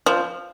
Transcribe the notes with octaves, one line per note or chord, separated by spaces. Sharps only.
F3